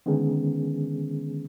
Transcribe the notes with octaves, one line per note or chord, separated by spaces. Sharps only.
D3 D#3 G#3 B3 C#4 G#4